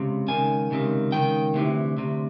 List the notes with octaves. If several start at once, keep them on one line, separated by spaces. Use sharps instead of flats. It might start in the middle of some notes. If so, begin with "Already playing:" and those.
Already playing: C#2 C3
C#2 C3 D#3 G#5
C#2 C3 D#3
C#2 C3 D#3 G5
D2 C3 E3
D2 C3